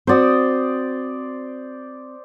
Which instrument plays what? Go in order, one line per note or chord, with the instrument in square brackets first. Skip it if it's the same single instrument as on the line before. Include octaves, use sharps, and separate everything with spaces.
[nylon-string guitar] C4 F#4 [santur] C5 D5 D#6